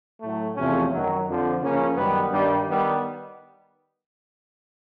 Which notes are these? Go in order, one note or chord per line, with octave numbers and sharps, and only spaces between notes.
A2 F#3 A3
E2 C3 F3 A3 C#4
F#2 D#3 F#3
F2 D3 F3
C#3 F3 A#3 C#4
F#2 D#3 G3 B3
G2 D#3 G3
D#3 G3 B3